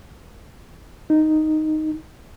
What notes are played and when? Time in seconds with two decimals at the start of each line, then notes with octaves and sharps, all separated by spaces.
1.10 D#4